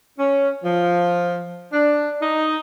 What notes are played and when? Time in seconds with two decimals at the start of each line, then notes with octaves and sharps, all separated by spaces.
0.19 C#4
0.64 F3
1.73 D4
2.22 D#4